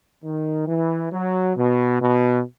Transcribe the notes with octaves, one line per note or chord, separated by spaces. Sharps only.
D#3
E3
F#3
B2
B2